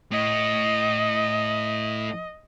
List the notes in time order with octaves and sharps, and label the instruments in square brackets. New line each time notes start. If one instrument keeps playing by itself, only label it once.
[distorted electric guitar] A2 [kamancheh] D#5